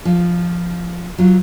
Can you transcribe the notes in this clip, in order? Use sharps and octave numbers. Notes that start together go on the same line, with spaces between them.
F3
F#3 F4